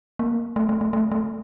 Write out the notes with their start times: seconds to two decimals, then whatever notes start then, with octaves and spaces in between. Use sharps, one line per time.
0.19 A#3
0.56 A3
0.69 A3
0.81 A3
0.93 A3
1.12 A3